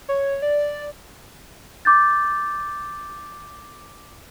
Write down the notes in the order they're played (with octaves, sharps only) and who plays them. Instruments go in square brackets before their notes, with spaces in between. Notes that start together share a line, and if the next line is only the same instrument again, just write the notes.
[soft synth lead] C#5
D5
[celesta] D6 G6 A6